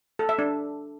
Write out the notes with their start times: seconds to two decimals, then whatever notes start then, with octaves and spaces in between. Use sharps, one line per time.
0.19 A4
0.29 E5
0.39 D4